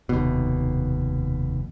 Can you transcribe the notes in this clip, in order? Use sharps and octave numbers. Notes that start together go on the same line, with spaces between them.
F1 D#2 B2